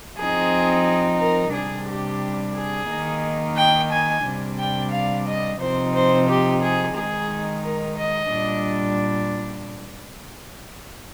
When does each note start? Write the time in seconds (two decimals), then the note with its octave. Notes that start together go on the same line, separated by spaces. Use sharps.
0.18 F3 C4 D#4 G#4
1.20 A#4
1.54 C3 G3 D4 G#4
1.88 G4
2.55 G#4
2.90 D#3 A#3 D#4
3.57 G5
3.91 G#5
4.24 C3 G3 D4
4.59 G5
4.92 F5
5.27 D#5
5.60 C3 F3 C4 D#4 C5
5.94 C5
6.28 G4
6.62 G#4
6.96 D#3 G#3 D#4 G#4
7.63 A#4
7.98 D#5
8.31 A#2 G3 D4